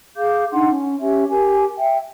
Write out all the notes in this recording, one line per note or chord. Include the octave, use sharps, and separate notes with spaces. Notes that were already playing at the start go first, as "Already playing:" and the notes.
G#4 F5 D6 G6
D4 D#4 F#5 C6
C#4
C#4 G4 C#5 E5
G4 A#4 G#5
E5 G5